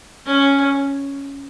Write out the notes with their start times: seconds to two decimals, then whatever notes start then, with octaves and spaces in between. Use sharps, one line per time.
0.26 C#4